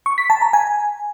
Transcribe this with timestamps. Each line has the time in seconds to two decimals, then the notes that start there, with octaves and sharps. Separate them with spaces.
0.06 C#6
0.18 B6
0.30 A5
0.42 A#5
0.53 G#5